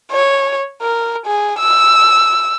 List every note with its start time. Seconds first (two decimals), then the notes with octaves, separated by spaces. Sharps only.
0.12 C#5
0.82 A#4
1.26 G#4
1.59 E6